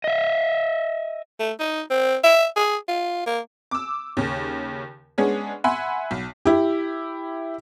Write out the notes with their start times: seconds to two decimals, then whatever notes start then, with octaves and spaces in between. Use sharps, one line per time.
0.04 D#5 E5
1.39 A3
1.60 D#4
1.90 C4
2.24 E5
2.56 G#4
2.88 F4
3.26 A#3
3.71 D6 E6
4.17 D#2 C#3
5.18 G#3 B3 C#4 D4 G#4
5.64 E5 F#5 G#5 B5 C6
6.11 B1
6.45 E4 G4